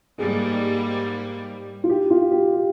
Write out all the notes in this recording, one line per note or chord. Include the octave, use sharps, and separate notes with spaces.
G#2 G3 A#3 G#4
F4
G4
F4
G4
G4